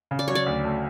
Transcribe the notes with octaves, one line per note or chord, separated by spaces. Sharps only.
C#3
D5
F#3 C#5
D5
D2
A3